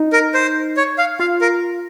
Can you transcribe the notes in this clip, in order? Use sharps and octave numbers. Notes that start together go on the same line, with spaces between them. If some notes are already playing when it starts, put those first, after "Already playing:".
Already playing: D#4
A#4
C5
C#5
F5
F4 F5
A#4